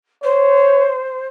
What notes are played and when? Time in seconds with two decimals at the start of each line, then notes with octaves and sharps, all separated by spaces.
0.23 C5 C#5